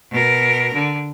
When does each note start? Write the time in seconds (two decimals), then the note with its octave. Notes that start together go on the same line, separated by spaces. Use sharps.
0.11 B2 A#4
0.74 D3